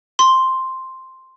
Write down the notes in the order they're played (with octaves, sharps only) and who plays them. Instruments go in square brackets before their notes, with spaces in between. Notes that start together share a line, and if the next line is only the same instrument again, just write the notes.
[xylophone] C6